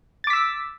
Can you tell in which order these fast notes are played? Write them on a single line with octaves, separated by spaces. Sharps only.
A6 D6 B6 E6